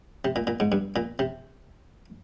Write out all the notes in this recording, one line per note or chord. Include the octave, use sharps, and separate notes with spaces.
C3
A#2
A#2
G#2
G2
A#2
C3